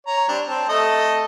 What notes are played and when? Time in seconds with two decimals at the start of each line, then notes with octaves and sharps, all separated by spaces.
0.07 C#5 A#5
0.29 G3 C4 D4
0.48 C4 A5
0.69 A3 A4 D#5